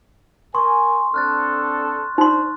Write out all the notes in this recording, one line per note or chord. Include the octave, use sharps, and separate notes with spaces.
A#4 G#5 C6 C#6 D#6
C4 D4 A4 F6 F#6 A6
D4 D#4 C5 C6